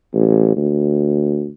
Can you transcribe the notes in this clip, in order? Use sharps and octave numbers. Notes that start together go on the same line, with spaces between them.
A1
D2